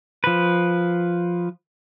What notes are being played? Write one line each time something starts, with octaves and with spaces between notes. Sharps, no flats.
F3 B4